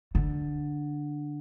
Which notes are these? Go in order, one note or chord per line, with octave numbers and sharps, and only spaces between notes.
D3